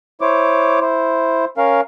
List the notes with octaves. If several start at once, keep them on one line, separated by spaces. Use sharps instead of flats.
E4 C5 C#5 D6
E4 C5
C#4 A#4 F5